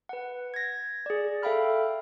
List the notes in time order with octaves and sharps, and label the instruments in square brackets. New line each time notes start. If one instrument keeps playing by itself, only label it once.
[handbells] B4 F#5
G#6 A#6
G#4 D5
A4 E5 F5 G5 B5 F6